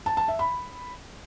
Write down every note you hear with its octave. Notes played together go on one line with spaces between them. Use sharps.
A5
A5
E5
B5